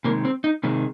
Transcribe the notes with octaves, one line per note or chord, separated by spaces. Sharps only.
C3 D#3 G#3 A#3
C4
D#4
C3 D#3 G#3